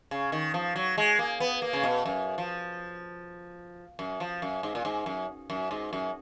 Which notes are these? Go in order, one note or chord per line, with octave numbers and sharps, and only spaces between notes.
C#3
D#3
F3
F#3
G#3
A#3
B3
A#3
C#3
B2
F#2
F3
F#2
F3
F#2
G#2
A#2
G#2
F#2
F#2
G#2
F#2